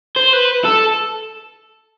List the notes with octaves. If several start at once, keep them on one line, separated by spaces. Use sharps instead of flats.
C5
B4
A4